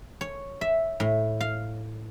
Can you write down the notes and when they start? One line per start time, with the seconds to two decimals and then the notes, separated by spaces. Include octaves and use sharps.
0.21 C#5
0.61 E5
1.00 A2
1.41 F5